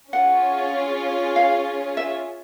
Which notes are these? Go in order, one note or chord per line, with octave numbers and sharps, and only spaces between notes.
C#4 F4 G#4 C#5 F#5
F5
E5